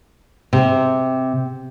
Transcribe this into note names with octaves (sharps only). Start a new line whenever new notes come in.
C3